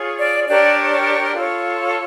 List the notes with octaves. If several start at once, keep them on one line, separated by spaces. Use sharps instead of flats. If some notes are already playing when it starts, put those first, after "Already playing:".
Already playing: F4 G#4 C#5
D5
D4 G4 A#4 C#5 D5
C#5
F4 A4 C#5